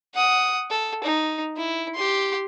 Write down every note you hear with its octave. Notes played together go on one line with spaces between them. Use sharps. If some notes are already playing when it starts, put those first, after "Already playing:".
F#5 D#6
A4
D#4
E4
G4 C6